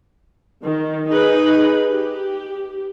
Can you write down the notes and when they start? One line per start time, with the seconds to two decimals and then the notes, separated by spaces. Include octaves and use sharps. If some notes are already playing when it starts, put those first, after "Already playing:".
0.63 D#3
1.08 D#4 G#4 B4
1.88 G4